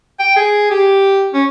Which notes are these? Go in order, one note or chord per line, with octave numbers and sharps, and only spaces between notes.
G5
G#4
G4
C#4